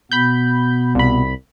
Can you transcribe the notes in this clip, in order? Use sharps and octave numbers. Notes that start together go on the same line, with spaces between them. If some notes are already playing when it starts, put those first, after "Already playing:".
B2 B3 B5 G6
C2 B5